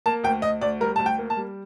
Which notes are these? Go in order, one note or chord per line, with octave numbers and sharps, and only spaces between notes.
A#3 A5
D2 G5
D2 D#5
D2 D5
G3 A#4
D2 A5
G5
A#3
A5
G3